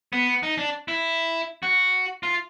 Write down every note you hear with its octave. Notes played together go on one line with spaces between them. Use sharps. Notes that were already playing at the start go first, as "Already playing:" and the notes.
B3
D#4
D4
E4
F#4
F4